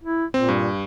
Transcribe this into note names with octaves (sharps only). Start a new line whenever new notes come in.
E4
A#2 C4
G2